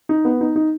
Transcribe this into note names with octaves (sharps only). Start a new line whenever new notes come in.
D#4
B3
D#4
D#4